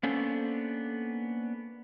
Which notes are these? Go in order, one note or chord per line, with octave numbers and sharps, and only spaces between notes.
A#3 B3 C#4 D4 A4 C5